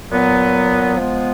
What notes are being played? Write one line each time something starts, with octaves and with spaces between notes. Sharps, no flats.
A#2 F#3 B3
F3 G#3 B3